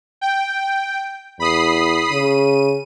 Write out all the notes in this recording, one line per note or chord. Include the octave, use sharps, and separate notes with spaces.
G5
E2 B5 D#6 C7
C#3 D#7